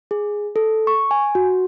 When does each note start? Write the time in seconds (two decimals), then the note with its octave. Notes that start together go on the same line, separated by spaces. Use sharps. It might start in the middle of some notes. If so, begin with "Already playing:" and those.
0.11 G#4
0.56 A4
0.87 C#6
1.11 G#5
1.35 F#4